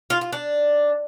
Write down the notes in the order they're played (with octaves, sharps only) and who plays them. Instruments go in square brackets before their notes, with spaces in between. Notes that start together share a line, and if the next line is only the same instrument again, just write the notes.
[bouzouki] F4
F4
D4